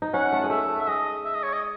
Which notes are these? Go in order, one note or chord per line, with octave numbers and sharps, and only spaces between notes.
D#4
C#4 F#5
A3
G#3
A3 E5
A3
E5
G#3 D#5
E5
D#5
C#5
D#5